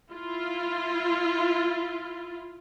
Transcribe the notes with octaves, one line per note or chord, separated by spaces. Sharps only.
E4 F4